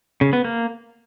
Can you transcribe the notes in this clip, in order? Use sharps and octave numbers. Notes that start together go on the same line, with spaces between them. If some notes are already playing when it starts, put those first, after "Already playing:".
C#3
B3
A#3